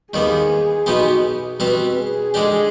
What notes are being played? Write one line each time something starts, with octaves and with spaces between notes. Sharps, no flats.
D#2 D#3 G3 B3 G#4
B1 B2 B3 D#4 G4
B2 G3 C4 G4 B4
G#4
D3 G#3 D4 G4